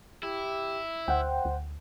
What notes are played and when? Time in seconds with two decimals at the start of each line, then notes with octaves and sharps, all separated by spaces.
0.23 E4 G4
1.08 D2 C5 F#5 G5
1.45 D2